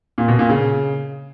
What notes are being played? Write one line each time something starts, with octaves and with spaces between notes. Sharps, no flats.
A#2
B2
A#2
C#3